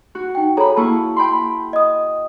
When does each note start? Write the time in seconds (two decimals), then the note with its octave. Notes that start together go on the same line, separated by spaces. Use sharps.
0.15 F#4
0.35 D#4 G5
0.57 G#4 A4 C#5 A#5 B5
0.77 A#3 E4 A5 C#6
1.16 G5 B5 C6
1.73 D#5 D#6